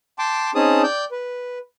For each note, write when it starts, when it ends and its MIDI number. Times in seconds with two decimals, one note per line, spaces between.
0.19 0.51 79
0.19 0.51 81
0.19 0.51 84
0.19 0.51 86
0.55 0.82 60
0.55 0.82 61
0.55 0.82 63
0.55 0.82 68
0.55 0.82 81
0.55 0.82 87
0.83 1.05 74
0.83 1.05 79
0.83 1.05 91
1.12 1.58 71